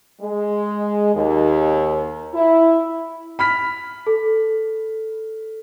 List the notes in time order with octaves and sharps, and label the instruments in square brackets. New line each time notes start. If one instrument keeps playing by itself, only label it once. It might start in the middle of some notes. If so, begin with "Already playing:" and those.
[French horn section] G#3
D#2
E4
[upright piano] B5 F6 B6
[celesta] A4